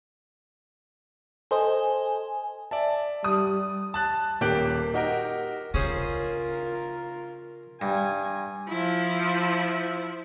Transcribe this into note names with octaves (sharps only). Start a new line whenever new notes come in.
A4 C5 D#5 G#5
D5 E5 A5
G3 D#6
A5 F#6 A6
D#1 A#3 G4 F#6 D7
D#4 F#4 G4 A#4
C#3 C#4 F4 G#4 A#4 C5
G2 G#5
F3 E4